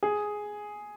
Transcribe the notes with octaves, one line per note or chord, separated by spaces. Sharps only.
G#4